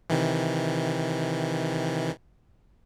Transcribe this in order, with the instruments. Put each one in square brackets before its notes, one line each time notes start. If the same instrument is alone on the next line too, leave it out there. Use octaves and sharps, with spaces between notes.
[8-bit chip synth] C3 D#3 E3